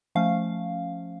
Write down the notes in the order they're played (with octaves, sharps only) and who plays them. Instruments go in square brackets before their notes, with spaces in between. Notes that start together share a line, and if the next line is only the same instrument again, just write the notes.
[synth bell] F3 A3 C#4 F5